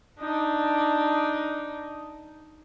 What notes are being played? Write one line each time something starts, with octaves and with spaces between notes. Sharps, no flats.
D4 D#4